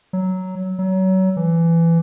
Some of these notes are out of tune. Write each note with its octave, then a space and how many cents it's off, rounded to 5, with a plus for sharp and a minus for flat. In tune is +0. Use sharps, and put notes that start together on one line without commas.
F#3 +10
F#3 +30
E3 +20